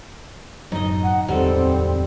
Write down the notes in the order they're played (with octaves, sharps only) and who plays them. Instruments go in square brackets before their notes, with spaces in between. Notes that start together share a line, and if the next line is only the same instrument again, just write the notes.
[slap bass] F#1 A2 F#3 [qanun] D#4 D#5
[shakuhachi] F#5
[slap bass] D1 E2 [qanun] G3 A4 [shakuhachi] C4